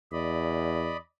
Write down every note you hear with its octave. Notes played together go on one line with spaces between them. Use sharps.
E2 D5 D#5 B5